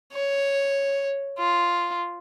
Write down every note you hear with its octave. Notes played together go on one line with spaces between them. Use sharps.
C#5
F4